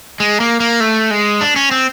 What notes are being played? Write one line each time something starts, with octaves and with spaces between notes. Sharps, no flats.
G#3
A#3
A#3
A3
G#3
D4
C#4
C4